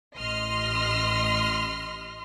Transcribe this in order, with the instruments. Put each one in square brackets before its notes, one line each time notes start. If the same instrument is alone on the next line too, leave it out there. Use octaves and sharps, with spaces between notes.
[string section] A1 D#5 C6 F6